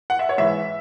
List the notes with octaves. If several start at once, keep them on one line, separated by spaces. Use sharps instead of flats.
F#5
E5
C#5
G#2 E3 E5